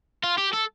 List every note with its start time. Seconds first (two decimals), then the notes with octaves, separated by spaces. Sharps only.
0.23 F4
0.38 G4
0.53 A4